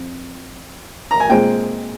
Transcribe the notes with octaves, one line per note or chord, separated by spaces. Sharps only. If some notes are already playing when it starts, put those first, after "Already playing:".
Already playing: F2
A#5
G#5
A#2 G#3 C4 G5